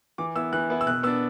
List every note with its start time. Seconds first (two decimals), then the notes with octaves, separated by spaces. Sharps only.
0.18 E3 D6
0.35 B3 E4 E6
0.53 E3 F#6
0.70 B3 E4
0.81 E6
0.86 B2 F#6
1.03 B3 E6
1.07 D4